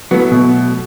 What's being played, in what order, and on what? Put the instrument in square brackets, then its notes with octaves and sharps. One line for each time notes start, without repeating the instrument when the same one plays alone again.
[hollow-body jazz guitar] F#3 A3 E4 [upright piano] B3
[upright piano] B2